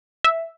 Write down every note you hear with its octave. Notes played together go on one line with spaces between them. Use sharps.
E5